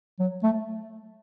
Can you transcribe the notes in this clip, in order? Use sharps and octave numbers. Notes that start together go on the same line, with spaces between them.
F#3
A3